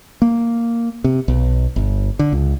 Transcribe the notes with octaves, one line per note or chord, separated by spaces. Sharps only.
A#3
C3
B1
G1
D3
C#2